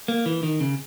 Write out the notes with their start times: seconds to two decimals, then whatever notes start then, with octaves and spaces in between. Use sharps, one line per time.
0.08 A#3
0.26 E3
0.43 D#3
0.61 C#3